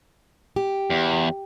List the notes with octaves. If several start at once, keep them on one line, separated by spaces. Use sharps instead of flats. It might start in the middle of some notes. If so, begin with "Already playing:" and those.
G4
E2